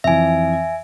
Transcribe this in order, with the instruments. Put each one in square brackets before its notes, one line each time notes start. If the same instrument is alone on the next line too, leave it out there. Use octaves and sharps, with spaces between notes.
[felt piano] F2 E3 [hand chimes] E5 G#5